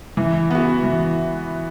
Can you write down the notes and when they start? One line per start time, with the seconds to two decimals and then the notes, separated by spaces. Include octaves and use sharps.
0.17 E3
0.50 B3 F#4
0.83 E3